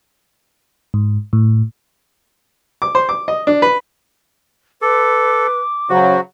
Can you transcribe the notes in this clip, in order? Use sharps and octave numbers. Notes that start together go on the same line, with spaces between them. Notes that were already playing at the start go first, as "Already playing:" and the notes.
G#2
A2
D6
C5
D6
D#5
D4
B4
A4 B4 D6
C#3 F#3 F#4 C5